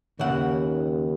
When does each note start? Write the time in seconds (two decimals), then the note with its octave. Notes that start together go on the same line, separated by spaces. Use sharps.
0.19 D#2 C#3 E5 F#5